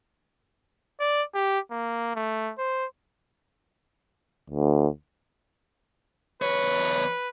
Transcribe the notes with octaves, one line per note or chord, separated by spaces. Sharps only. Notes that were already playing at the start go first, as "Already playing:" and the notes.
D5
G4
A#3
A3
C5
D2
E2 B4 C#5